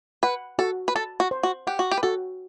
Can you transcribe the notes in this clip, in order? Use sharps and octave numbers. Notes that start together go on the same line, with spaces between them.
B4 F#5
F#4 A4
B4
A4 A5
F#4
C5
F#4
G4 F#5
F#4
G4
B4
F#4 A4